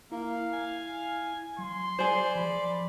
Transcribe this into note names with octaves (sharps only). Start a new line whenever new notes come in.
A#3 E4 F5
G#5
F#3 C6
G#4 C5 D5
F3 B5